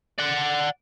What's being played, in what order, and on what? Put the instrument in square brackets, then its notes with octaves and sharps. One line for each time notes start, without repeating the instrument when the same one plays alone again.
[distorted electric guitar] D5 F#5